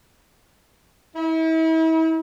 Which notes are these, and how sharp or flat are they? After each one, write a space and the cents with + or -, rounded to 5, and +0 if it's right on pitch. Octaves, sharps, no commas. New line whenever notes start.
E4 -40